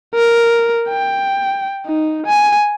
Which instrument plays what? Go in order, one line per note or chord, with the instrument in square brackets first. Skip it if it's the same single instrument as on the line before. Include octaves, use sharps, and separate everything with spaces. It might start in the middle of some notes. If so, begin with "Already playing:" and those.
[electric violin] A#4
G5
D#4
G#5